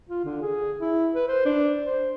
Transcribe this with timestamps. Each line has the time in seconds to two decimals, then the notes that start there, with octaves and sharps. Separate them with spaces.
0.09 F4
0.25 D3
0.42 G#4
0.81 E4
1.14 B4
1.28 C5
1.45 D4
1.84 C5